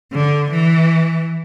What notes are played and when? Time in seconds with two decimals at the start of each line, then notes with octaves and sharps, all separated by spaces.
0.13 D3
0.51 E3